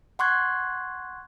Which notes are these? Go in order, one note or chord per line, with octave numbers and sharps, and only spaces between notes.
F#5 C6 C#6 F#6 G#6